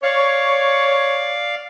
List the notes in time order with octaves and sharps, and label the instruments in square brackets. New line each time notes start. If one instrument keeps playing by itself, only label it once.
[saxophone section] C#5 [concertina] D5 F5